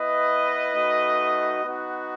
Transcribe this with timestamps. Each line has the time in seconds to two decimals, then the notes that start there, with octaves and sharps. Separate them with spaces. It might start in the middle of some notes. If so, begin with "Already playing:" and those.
Already playing: B3 E4 B4 D#5
0.73 A3 D#4 F#4
1.65 B3 D#4 F#4